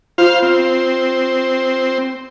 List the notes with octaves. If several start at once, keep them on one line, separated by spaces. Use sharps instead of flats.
F4 C5 F5
C4